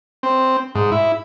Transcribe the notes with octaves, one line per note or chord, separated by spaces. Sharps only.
C4
G#2
E4